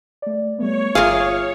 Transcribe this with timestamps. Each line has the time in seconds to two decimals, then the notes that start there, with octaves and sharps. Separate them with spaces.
0.22 A3 D5
0.58 G3 A3 B3 C#5
0.95 G1 F4 G#4 A#4 E5 F5 D6